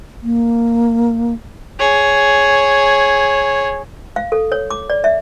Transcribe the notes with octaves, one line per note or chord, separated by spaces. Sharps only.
A#3
G#4 C#5
F5
A4
C#5
D6
D5
E5